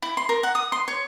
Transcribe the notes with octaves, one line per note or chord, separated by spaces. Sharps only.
E4
C6
A#4
F#5
D#6
C6
C#5